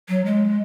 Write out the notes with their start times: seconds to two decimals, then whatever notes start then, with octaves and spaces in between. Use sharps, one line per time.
0.09 F#3
0.25 G#3